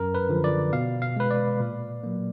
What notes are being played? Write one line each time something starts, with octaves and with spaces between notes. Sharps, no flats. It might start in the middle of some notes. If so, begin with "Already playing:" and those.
Already playing: F#2 A#4
B4
D3 F3
D5
B2 F5
F5
G#3 B4
D5
A#2
F#3 A#3